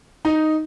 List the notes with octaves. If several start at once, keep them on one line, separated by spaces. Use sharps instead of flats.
D#4